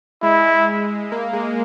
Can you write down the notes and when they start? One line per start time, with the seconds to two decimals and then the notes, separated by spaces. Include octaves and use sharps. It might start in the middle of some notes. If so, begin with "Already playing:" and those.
0.23 G#3 E4
1.12 A#3
1.33 G#3